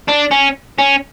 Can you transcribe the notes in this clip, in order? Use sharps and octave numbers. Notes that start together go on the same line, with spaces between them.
D4
C#4
C#4